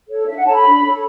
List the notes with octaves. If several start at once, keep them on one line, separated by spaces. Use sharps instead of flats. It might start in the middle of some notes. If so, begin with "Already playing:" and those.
A4 C#5
D4 E5
F#5
A4 C#5 A5
B5
D4
A4 C#5